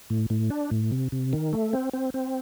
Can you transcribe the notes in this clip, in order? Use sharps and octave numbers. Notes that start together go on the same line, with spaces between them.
A2
A2
D4
A2
C3
C3
D#3
A3
C4
C4
C4